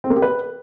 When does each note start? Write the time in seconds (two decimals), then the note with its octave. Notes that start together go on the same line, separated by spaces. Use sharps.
0.04 C4
0.10 A#3
0.16 G4
0.22 B4